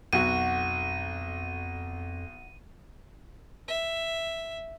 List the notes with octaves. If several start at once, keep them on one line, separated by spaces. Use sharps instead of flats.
B1 F2 F#4 F#5 D#7
E5